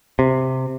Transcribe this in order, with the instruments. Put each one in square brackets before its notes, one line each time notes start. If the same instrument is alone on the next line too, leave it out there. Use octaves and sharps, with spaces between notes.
[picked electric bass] C3